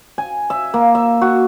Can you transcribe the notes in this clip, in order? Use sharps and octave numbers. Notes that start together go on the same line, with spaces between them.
G#5
E5
A#3
E5
F#4